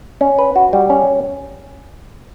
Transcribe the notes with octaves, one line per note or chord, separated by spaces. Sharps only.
C#4
B4
F#4
G3
C#4